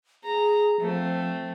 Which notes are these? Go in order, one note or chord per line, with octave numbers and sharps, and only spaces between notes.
G#4 A#5
F3 A3 C4